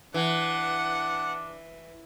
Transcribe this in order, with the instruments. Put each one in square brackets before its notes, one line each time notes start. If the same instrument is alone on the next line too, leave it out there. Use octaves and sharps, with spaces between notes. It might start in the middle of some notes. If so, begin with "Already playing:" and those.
[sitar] E3 [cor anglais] D4 [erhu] F#5